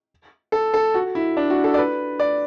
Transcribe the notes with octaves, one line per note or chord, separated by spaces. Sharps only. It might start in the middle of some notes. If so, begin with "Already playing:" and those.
A4
A4
F#4
E4
D4
F#4
A4
D5
B4
D5